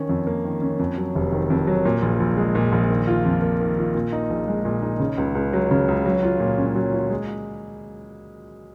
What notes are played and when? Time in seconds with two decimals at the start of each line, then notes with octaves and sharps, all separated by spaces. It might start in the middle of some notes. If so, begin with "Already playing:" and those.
Already playing: D#3 C#4
0.09 F2
0.27 A#3
0.45 D#3
0.62 C#4
0.79 F2
0.97 F#3
1.15 F1
1.32 D#3
1.50 F2
1.67 F#3
1.85 A#2
2.02 A#1
2.20 A#1
2.37 G#3
2.55 A#2
2.72 A#1
2.90 D#3
3.08 F4
3.25 F2
3.42 A#3
3.60 D#3
3.77 F4
3.95 A#2
4.12 D#4
4.30 A#1
4.47 G#3
4.65 A#2
4.82 D#4
5.00 C#3
5.18 C#2
5.35 C#2
5.53 F#3
5.71 C#3
5.88 C#2
6.05 F#3
6.23 F4
6.40 A#2
6.58 C#4
6.76 F#3
6.93 F4
7.10 G#3